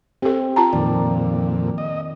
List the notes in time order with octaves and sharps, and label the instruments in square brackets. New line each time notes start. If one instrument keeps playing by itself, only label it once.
[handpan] C4 [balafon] G4 A4
[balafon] F4 A5 A#5
[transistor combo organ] F2 A#2 [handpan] D#3 G4 D5
[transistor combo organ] D#5